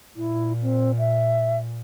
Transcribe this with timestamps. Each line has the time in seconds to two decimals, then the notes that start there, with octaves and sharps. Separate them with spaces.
0.16 A#2 E4
0.63 C4
0.98 E5